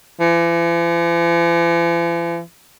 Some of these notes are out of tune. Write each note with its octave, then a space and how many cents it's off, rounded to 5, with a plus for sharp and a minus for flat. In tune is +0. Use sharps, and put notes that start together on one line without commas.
E3 +45